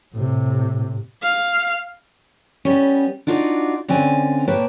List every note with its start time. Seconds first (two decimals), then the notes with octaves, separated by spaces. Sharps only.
0.14 A2 C3
1.23 F5
2.65 G3 B3 C#4
3.27 D4 D#4 F4 F#4 C#5 D5
3.88 D3 C4 C#4 D5 G#5
4.48 A#2 A#3 B4 C#5 G5 A5